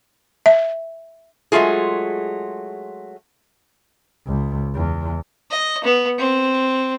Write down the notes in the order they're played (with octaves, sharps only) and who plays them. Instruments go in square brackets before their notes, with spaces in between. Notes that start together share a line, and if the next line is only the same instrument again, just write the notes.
[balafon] E5
[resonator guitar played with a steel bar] F#3 G#3 A3 F4 G#4
[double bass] C#2
E2
[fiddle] D#5
B3
C4